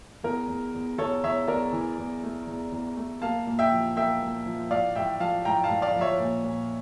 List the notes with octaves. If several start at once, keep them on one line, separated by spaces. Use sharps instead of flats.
E2 A#4
E2
E2
E2 A4 C#5
E2 C#5 E5
E2 A#4 D5
E3
E2
A3
E2
E2
A3
A#3 F5 A5
A#2
E5 G5
F3
A#3 E5 G5
A#2
F3
A2 D5 F5
A2 E5 G5
F3 F5 A5
A2 G5 A#5
F5 A5
A2
D5 F5
F3
C#5 E5
A#2
A#2